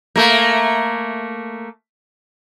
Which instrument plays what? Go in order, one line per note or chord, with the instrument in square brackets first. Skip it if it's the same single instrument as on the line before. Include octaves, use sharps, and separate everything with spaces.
[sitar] A3 A#3